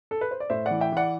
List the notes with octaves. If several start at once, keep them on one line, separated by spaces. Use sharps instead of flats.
A4
B4
C5
D5
A2 C5 E5
E3 D5 F#5
E5 G5
E3 D5 F#5